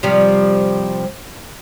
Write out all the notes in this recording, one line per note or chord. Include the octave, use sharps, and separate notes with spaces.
C3 F3 G3